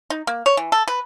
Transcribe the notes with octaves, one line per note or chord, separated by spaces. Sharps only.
D#4
A#3
C#5
E3
A4
B4